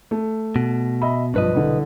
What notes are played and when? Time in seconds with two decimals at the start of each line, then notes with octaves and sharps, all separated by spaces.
0.11 A3
0.56 B2
1.02 D#5 E5 B5
1.34 B1 G2 F3 B4 D#5
1.55 C2 D3